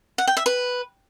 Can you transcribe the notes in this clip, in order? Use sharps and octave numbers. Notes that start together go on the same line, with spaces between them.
F#5
G5
E5
B4